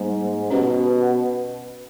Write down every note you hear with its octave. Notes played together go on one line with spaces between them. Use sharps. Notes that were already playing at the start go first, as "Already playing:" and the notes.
Already playing: G#2 G3 A#3
B2 C#4 G4 C#5